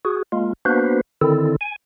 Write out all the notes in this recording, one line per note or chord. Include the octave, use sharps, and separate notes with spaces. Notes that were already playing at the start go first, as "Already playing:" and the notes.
F#4 G#4
G#3 A#3 F4
A#3 B3 D4 F#4 B4 C5
D3 D#3 C4 E4 A4
G#5